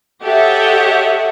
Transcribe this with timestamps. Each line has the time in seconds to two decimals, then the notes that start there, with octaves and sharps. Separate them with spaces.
0.23 G4 A4 C#5 D#5 E5 F#5